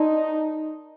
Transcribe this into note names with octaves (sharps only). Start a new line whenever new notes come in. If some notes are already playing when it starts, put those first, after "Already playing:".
Already playing: D#4 A#4 D5 A5 C6